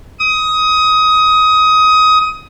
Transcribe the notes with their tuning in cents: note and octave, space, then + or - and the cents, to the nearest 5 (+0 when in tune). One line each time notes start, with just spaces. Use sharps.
D#6 +20